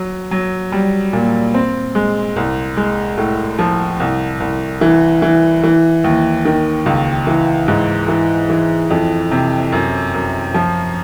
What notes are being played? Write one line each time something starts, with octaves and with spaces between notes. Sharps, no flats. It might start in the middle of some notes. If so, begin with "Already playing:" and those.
Already playing: F#3
F#3
G3
A#2
C4
G#3
C2
G#3
A2
F3
C2
C2
E3
E3
E3
D#2
D#3
C#2
E3
G#2
E3
E3
F2
C3
F#2
F#2
F3